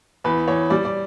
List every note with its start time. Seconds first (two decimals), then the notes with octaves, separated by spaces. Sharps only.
0.24 E2 B4
0.48 E2 C#5
0.70 G3 D5
0.85 D5